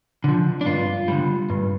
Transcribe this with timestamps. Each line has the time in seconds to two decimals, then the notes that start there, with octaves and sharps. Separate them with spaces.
0.24 D3 F3
0.61 D4
0.66 G2 F4
1.08 D3 G3
1.50 G2